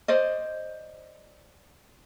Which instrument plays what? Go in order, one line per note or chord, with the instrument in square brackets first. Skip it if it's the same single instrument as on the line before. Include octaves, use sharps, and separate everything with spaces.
[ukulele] C5 D5 D#5